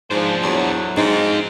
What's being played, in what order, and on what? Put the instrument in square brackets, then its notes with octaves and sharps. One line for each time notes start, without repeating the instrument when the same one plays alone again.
[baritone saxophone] G#2 [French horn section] F3 [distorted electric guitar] D4 C5
[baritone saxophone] E2 [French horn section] A2 F#3
[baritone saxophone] G#2 [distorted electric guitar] C4 F4 [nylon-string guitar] D#4